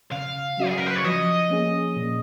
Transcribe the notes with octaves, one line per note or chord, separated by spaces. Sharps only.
C#3 F5
F#3 C#4 F#4
G#4
A#4
B4
C#5
F3 D#5
A#3 C#4 G#4
A#2